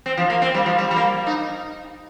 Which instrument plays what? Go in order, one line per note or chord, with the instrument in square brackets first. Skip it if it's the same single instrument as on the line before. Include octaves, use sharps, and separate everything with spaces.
[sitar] C4
F3
A#3
C4
G3
F3
G3
G3
A#3
D#4